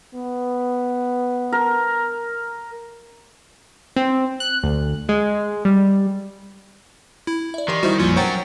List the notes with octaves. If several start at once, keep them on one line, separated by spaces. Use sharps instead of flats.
B3
A#4
C4
F#6
D2
G#3
G3
E4
D5 E5
D#3 E3 G4 D5 C6 C7
G3 D#4 E4 F#4 C5 D#5
A#1 F2 A#2 F#3 C#4 F4
A#4 C5 C#5 F#5 G5 A#5 C#6 A6